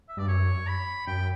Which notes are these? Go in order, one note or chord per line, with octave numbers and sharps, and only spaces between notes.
E5
G2 D5
F#2 C#5
B5
F#2 G5